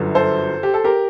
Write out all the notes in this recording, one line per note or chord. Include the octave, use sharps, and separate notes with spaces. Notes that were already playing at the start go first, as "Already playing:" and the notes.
Already playing: G1 F#2 D3
A4 C5
G4
A4
G4 A#4